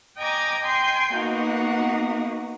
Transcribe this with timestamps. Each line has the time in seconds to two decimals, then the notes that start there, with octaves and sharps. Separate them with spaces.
0.18 D#5 G5 G#5 A#5 D6 G#6
0.62 G5 G#5 C6 G6
1.15 A#3 B3 D#4 F#4 F#5